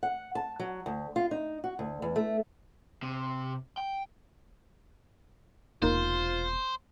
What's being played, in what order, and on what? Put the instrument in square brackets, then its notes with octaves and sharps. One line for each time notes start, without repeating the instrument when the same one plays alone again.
[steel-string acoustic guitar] F#5
A5
F#3
D2
F4
D#4
F#4
D2
E2
A3
[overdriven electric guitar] C3
G5
[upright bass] E1 C3 [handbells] A#3 D#4 A#4 [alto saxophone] F4 [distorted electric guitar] C5